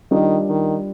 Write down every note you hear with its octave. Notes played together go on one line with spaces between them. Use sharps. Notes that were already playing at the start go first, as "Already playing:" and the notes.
D#3 G3 D4 F4 A#4 D#5
D#3